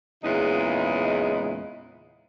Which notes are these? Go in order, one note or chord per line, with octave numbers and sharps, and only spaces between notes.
E2 A#2 C#3 G#3 D#4 E4